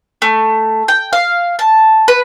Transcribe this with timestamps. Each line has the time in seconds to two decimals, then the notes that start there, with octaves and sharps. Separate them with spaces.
0.22 A3
0.88 G5
1.13 F5
1.59 A5
2.08 B4